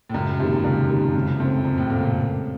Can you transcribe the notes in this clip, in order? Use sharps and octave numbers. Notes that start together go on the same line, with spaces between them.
A2
C#2 F#2
F2 C3 D#3 A#3
C#2 F#2
F#2 C3 D#3 A#3
C#2 F#2
F2 C#3 A3 C4
C#2 F#2
A2
A#2 C#3 A3 C4
A#2